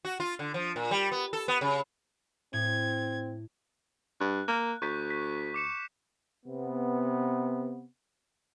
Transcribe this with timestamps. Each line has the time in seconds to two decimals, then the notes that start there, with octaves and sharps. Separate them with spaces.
0.05 F#4
0.20 F4
0.39 D3
0.54 F3
0.76 A#2
0.91 G3
1.12 B3
1.33 A4
1.48 B3
1.61 C#3
2.53 A2 C4 G#6
4.21 G2 F#6
4.48 A#3
4.82 D2 C#6 G6 B6
5.10 B6
5.54 D6 C#7 E7
6.46 C3 B3